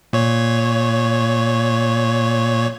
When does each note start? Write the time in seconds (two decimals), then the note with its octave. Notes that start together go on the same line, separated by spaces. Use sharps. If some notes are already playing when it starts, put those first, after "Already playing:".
0.13 A#2 C#5